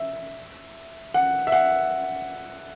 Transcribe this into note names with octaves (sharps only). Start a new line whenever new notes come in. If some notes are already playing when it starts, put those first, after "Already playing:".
Already playing: E5
F#5
E5
F#5